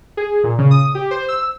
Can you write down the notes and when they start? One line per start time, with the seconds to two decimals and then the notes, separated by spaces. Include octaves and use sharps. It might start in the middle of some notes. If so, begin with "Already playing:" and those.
0.17 G#4
0.44 A#2
0.58 C#3
0.71 D#6
0.95 G4
1.11 C5
1.28 E6